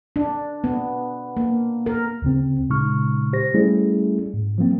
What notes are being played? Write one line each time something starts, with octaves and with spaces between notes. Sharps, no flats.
D4
B3
A#3
A#4
D2 C#3 C4
A#2 C#3 G#3 D#4 C#6 F6
G4 C5 A#6
G3 A3 C#4 E4 G#4
G#2
F3 F#3 A#3 C4